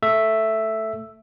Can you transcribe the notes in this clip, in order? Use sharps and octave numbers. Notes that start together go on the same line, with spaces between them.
A3 E5